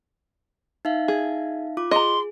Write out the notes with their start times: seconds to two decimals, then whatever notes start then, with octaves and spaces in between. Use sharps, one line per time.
0.85 D#4 E5 F5
1.08 G#4
1.77 F4 D6
1.91 G#4 D#5 A#5 C6